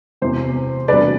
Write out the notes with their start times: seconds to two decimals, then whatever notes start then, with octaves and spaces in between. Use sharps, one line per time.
0.22 E1 E2 C3 E3 C5
0.88 E1 D2 C3 G3 B4 D5